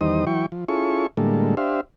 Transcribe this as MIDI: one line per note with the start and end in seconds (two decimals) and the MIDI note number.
0.01 0.25 40
0.01 0.25 51
0.01 0.25 55
0.01 0.25 63
0.01 0.25 72
0.01 0.25 87
0.27 0.46 52
0.27 0.46 54
0.27 0.46 64
0.27 0.46 79
0.27 0.46 85
0.52 0.65 53
0.68 1.07 61
0.68 1.07 64
0.68 1.07 65
0.68 1.07 68
0.68 1.07 69
0.68 1.07 85
1.17 1.55 45
1.17 1.55 50
1.17 1.55 55
1.17 1.55 56
1.17 1.55 58
1.17 1.55 69
1.57 1.81 62
1.57 1.81 67
1.57 1.81 72
1.57 1.81 76
1.57 1.81 77